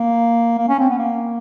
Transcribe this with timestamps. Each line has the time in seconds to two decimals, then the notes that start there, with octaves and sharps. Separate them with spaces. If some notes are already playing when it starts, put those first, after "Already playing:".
Already playing: A#3
0.59 A#3
0.68 C#4
0.79 C4
0.90 B3
0.99 A#3